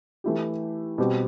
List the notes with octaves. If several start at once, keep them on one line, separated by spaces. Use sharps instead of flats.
E3 A3 E4 G4
B2 G3 C4 G4